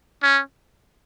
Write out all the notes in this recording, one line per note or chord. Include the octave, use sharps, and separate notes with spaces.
C#4